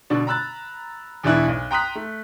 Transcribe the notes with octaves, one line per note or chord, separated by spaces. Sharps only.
B2 D3 D4 F#4
A#5 B5 E6 F#6 A6
E2 B2 E3 D4 E4 F#6
B1
G5 A#5 C6 D#6 F#6 B6
A3